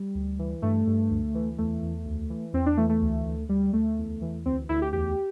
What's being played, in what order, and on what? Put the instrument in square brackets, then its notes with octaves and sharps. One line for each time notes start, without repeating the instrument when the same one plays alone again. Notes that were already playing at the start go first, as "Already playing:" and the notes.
Already playing: [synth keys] G3
D2
E3
G2 A3
G2
D2
E3
E2 A3
E2
D2
E3
E2 C4
D4
E3 A3
A3
D2
D2
D2 G3
D2 A3
E2
E3
D2 C4
D2 E4
G4
E2 G4